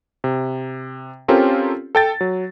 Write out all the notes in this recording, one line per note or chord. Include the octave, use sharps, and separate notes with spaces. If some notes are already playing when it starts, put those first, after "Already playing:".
C3
C4 C#4 F4 G4 A4 A#4
A4 G5 A6
F#3